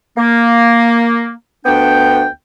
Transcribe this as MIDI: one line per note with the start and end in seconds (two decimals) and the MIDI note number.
0.17 1.30 58
1.65 2.25 38
1.65 2.25 59
1.65 2.25 62
1.65 2.25 79